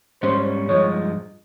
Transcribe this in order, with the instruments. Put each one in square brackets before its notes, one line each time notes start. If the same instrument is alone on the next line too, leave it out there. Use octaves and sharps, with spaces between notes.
[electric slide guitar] G#2 G3 C#4 [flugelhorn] C5
[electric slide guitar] G2 F3 G#3 [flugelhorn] C#5